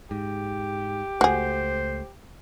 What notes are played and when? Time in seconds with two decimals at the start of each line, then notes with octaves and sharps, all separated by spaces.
0.11 G#2 G4
1.21 C#2 A3 F#4 G#4 C5